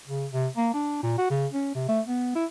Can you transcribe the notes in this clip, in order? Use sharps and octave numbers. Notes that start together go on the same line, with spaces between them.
C#3
C3
A#3
D4
A#2
F#4
C#3
C#4
C3
A3
B3
E4